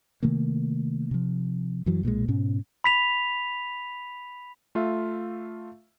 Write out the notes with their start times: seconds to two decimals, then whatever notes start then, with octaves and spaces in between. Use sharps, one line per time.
0.23 C3 D#3 A3 A#3
1.11 C3 F3
1.86 F#2 E3 F#3
2.03 B1 A#2 D#3 G#3
2.28 G#2 B2 C#4
2.84 B5 B6 F7
4.75 A3 F4 E5 F5